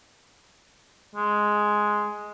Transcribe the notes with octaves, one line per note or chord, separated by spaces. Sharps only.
G#3